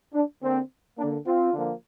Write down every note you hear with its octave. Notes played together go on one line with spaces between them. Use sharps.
D4
D3 A#3 C4
D3 A#3 D4
C4 F4
D3 F3 A#3